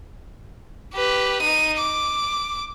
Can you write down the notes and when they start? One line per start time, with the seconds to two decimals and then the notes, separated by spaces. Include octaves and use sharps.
0.93 G4 B4
1.42 D#4 D#7
1.77 D6